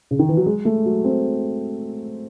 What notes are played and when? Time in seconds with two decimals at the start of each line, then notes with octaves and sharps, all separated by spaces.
0.11 C#3
0.19 D#3
0.29 E3
0.37 F#3
0.46 G#3
0.65 A3
0.85 F#3
1.04 C4